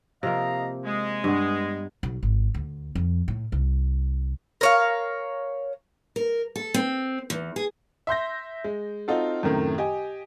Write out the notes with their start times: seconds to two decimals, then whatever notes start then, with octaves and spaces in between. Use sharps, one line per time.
0.23 C3 F3 A#3 D#5 F5 A#5
0.85 G#3
1.24 G2 B3
2.03 B1
2.23 G#1
2.54 D2
2.95 F2
3.28 A2
3.52 C2
4.61 A#4 C#5 F5
6.16 A#4
6.56 A4
6.74 C4
7.30 E2
7.56 G#4
8.07 E5 C6 G6 A#6
8.64 G#3
9.08 C4 D#4 F4 F#4 A4
9.43 F#2 A2 C3 D#3 A3
9.78 G4 D#5 G#5